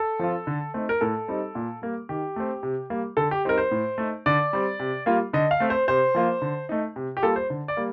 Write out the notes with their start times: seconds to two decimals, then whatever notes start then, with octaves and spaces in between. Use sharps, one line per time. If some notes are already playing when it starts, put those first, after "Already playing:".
Already playing: A4
0.19 F3 C4 F4
0.47 D3
0.74 A3 C4 D#4
0.89 A#4
1.01 A2 A4
1.28 G3 C4 D#4
1.55 A#2
1.82 G3 A#3
2.09 D#3 G4
2.36 A3 C4
2.63 C3
2.90 G3 A#3
3.17 D3 A4
3.31 G4
3.45 G3 C4 D#4 A#4
3.58 C5
3.71 A2
3.98 A3 D#4
4.26 D3 D5
4.53 G3 C4
4.79 C3
5.06 G3 A#3 F4
5.33 D3 D#5
5.51 F5
5.60 A3 C4
5.70 C5
5.88 C3 C5
6.15 F3 A#3 F4
6.42 D3
6.69 A3 D#4
6.96 C3
7.17 G4
7.22 G3 A#3 F4 A4
7.36 C5
7.50 D3
7.68 D5
7.77 G3 A#3